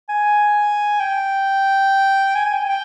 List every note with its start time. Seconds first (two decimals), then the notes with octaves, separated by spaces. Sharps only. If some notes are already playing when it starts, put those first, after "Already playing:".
0.09 G#5
1.00 G5
2.35 G#5
2.46 G#5
2.52 G5
2.64 G#5
2.69 G5